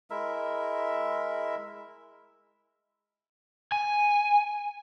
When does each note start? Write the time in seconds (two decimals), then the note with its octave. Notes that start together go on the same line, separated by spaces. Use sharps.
0.10 G#3 E4 A#4 E5
3.72 G#5